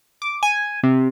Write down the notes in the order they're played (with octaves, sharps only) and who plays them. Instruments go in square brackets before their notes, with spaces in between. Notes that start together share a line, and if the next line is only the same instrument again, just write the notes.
[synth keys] D6
G#5
C3